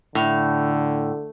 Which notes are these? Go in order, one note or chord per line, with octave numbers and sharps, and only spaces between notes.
A2 D3